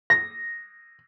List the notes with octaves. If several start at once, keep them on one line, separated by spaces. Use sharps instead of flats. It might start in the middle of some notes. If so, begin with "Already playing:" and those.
A#6